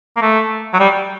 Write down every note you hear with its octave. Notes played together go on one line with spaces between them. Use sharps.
A#3
A3
F#3
G3